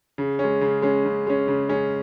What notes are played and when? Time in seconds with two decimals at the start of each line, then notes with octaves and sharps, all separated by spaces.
0.18 C#3
0.39 G#3 C#4
0.61 C#3
0.82 G#3 C#4
1.05 C#3
1.27 G#3 C#4
1.48 C#3
1.69 G#3 C#4